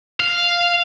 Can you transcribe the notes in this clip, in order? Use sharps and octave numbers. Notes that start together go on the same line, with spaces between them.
F5